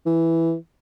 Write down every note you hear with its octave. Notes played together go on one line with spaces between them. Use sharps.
E3